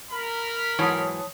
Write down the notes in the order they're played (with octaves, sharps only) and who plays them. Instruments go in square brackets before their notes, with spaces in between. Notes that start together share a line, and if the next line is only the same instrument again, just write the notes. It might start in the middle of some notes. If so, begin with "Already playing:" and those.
[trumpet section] A#4 B5
[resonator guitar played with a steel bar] G#2 E3 F#3 [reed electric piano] C#5 A5 D#6